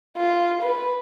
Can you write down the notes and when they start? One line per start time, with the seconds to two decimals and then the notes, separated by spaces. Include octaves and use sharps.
0.17 F4
0.62 B4